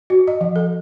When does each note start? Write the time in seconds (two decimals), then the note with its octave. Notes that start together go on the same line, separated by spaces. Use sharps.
0.10 F#4
0.28 D#5
0.41 F3
0.56 A4